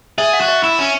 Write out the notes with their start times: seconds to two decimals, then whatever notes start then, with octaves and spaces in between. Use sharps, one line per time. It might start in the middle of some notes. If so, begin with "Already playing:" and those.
0.18 G#4 E5
0.33 F#5
0.41 F#4
0.48 E5
0.63 E4
0.79 C#4